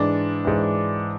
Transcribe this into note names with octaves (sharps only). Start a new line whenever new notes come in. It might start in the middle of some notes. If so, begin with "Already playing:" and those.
Already playing: G#2 E3 D4
G#2 E3